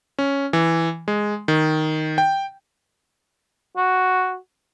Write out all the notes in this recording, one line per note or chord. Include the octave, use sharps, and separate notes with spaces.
C#4
E3
G#3
D#3
G5
F#4